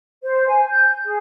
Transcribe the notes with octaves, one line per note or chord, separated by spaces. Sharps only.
C5
G#5
G6
G#4